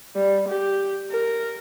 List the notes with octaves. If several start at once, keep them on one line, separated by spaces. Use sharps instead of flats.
G3
G4
A#4